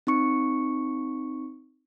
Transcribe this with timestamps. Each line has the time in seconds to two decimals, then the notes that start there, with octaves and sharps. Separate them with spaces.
0.07 C4 D#4 C#6 C#7